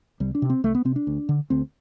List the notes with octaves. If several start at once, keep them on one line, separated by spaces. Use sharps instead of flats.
C2 G3
D4
C3
C4
C2 A3
B3
C3 C4
D4
D2
D3
D2 C4